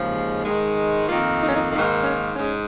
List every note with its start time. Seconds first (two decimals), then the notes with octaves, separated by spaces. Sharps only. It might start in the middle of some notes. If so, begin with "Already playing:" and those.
Already playing: D#2 C#3 F3 G#3
0.45 G#2 D#3 G#3
1.08 F2 D#3 A#3 F4
1.41 D#4
1.48 C#4
1.56 D#4
1.72 G#2 D#3 A#3 D#4
2.04 C#4
2.35 G#2 G#3 C#4